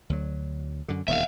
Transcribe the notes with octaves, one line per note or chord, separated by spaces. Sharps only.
D2 F#3
F#2 D3
E1 D#2 D#3 E5 F5